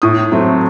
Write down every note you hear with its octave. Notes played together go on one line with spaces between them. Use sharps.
A2 D#6
F#3 A3 C4